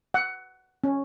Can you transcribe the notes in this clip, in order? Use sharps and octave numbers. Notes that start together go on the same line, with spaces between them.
F#5
C#4